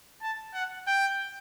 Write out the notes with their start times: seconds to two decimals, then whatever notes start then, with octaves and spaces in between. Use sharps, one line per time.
0.22 A5
0.54 F#5
0.87 G5